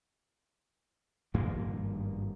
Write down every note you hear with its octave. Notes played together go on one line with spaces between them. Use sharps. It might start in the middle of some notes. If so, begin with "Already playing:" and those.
G#1 G2 F3 A#3